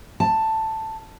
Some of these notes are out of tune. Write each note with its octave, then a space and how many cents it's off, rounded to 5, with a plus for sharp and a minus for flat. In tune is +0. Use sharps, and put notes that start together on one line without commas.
A5 +5